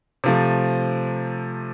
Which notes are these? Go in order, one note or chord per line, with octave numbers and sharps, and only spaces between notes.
C3 F3 A3